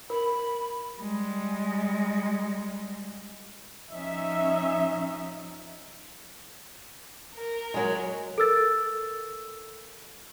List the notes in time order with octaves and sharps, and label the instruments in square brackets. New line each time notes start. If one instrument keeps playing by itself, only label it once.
[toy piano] A#4 [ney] B5
[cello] G3 G#3
[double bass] F3 D#4 [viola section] C#4 E5
[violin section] A#4
[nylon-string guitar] F#3 G#3
[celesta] A4 A#4 E6 A6